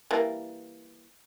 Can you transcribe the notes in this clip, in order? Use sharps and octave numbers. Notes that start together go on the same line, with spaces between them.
E3 G3 A#3